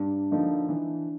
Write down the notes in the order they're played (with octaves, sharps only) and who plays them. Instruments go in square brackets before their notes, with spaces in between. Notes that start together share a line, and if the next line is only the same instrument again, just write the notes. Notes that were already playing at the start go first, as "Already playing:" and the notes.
Already playing: [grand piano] G2 [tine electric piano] D4
[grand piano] D3 F3 A#3 D#4
E3